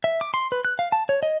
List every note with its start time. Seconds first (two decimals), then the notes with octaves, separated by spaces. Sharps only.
0.04 E5
0.21 D6
0.34 C6
0.52 B4
0.65 F#6
0.79 F5
0.92 A5
1.09 C#5
1.23 D#5